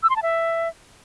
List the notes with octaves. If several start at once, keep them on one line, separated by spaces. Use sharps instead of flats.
E6
C6
A5
E5